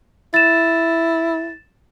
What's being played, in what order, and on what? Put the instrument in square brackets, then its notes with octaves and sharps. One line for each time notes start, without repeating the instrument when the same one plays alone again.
[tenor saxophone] E4 [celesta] A6 E7